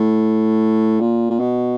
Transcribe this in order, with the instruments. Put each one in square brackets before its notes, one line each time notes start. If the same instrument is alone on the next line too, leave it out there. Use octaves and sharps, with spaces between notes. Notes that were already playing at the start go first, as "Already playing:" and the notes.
Already playing: [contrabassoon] A2
A#2
A#2
B2